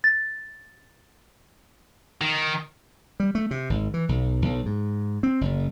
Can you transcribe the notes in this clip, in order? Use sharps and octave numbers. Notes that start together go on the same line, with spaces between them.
A6
D#3
G3
A3
C3
G#1
E3
B1
B1
G#2
C4
F#1